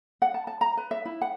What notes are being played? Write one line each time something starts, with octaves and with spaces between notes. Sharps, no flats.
F#5
A5
A5
A#5
B4
E5
E4
F#5